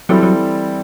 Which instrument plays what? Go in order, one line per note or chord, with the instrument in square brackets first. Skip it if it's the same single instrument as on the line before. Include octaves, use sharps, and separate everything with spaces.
[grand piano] E3 G3 C4 E4 A4 [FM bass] F#3
[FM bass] F#3